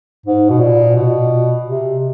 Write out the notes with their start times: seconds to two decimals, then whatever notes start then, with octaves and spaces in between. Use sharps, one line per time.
0.26 G#2
0.49 B2
0.60 A#2
0.96 B2
1.66 C3